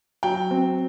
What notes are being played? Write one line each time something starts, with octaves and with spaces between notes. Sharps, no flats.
F#3 G5
C4